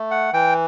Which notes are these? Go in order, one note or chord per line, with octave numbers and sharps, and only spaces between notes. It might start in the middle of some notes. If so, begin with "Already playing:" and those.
Already playing: A3
F#5
E3 G5